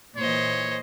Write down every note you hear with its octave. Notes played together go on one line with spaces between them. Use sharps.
A#2 E3 C5 C#5 D#5